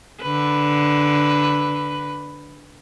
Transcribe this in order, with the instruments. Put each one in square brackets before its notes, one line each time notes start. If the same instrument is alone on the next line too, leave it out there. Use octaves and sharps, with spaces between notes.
[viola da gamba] D3 B4